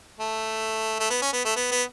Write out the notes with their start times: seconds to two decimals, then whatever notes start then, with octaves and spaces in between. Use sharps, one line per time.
0.19 A3
0.99 A3
1.10 B3
1.22 C#4
1.33 B3
1.45 A3
1.56 B3
1.71 B3